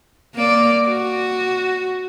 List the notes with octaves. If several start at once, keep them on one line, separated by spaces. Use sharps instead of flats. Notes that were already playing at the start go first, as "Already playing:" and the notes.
A#3 D5
F#4